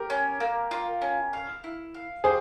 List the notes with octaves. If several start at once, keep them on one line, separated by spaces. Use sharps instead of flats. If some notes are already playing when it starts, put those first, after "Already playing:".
Already playing: G4 A#4
C#4
A#3
F4
C#4
F5
E4
F5
G4 G#4 C5